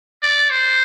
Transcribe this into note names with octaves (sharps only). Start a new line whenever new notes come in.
D5
C5